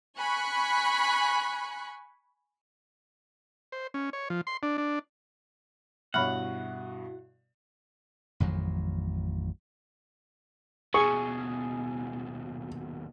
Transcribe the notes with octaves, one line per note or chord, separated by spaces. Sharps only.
G#5 B5 C#6 F#6
C5
C#4
C#5
F3
C6
D4
D4
G2 B2 E4 F#4 C#5 F#5 B5 F6
A1 F2 D#3 F#3
D#2 B2 G#4 C#6